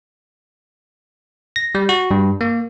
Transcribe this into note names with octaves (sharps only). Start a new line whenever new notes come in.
A#6
G3
F#4
G2
A#3